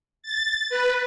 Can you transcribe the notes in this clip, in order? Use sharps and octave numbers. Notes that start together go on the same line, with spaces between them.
A6
B4